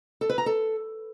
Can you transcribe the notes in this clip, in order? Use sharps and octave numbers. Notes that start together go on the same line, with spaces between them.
A4
B4
A#5
A4